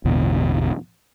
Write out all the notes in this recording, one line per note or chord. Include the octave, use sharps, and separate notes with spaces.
A1 E2 B2 D3